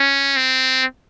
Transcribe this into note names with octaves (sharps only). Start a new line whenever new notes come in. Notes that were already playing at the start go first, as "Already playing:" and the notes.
Already playing: C#4
C4